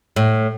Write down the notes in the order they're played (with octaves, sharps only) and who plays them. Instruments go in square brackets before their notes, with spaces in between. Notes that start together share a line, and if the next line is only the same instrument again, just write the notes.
[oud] A2